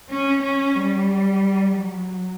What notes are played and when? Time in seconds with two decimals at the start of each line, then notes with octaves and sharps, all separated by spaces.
0.10 C#4
0.43 C#4
0.75 G3
1.74 F#3